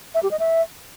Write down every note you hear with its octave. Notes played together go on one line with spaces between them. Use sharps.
E5
G4
D#5
E5